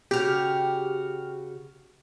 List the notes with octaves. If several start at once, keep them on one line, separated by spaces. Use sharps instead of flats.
C#3 F#4 G4 F6